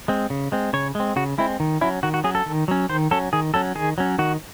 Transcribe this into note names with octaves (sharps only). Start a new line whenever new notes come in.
G#3 C4
C#3
G#3 C4
C#3 C#5
G#3 C4
C#3 F#4
G#3 C4 E4
D#3
F#3 C#4 E4
D#3 F#4
F#4
F#3 C#4 G#4
A4
D#3
F#3 C#4
D#3 C5
F#3 C#4 A4
D#3 G#4
F#3 C#4 A4
D#3 G#4
F#3 C#4
D#3 F#4